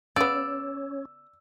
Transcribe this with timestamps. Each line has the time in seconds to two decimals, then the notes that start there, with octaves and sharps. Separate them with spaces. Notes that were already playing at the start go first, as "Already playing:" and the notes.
0.16 C#3 B3 C#4 C#5 D5 E6